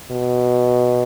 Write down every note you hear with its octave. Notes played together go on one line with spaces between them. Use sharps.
B2